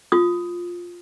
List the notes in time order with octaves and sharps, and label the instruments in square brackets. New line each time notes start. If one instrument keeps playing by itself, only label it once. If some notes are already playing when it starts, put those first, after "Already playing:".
[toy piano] F4 D#6